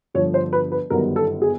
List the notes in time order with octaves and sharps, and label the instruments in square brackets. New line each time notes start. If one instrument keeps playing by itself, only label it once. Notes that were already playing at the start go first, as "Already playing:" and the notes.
[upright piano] G1 G2 D3 F3 C#5
C5
B4
B4
G1 F#2 D#3 G3 B3 A#4
A4
G#4